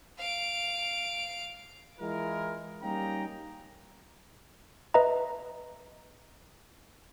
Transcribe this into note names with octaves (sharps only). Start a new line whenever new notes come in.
F5 D7
E3 G#3 E4 F4 A#4
G3 A#3 C#4 D#4 G5 A#5
B4 D#5 E5 A#5